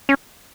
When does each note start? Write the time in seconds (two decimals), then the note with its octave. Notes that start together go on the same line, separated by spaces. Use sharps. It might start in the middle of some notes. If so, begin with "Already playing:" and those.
0.09 C#4